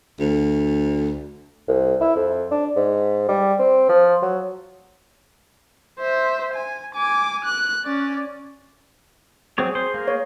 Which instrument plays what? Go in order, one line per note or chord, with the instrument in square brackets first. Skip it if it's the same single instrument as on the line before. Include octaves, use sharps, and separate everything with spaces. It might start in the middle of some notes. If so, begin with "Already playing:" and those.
[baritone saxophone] D2
[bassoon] C2
E4
F2
D4
G#2
G3
C4
F3
F#3
[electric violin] C5 E5
G#5
G#5 D6
F#6
C#4 D5
[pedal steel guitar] F#3 C4 C#5 [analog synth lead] G#4
[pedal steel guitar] C5
A#3
[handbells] C#5